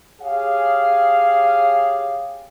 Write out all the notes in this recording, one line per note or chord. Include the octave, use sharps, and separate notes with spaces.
G4 G#4 C#5 F5